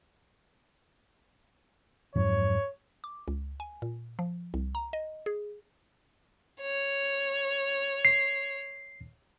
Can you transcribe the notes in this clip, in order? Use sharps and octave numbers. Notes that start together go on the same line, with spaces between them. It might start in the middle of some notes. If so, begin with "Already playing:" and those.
F2 G#2 F#3 C#5
D6
C#2
G#5
A#2
F3
C2
A#5
D#5
G#4
C#5
C7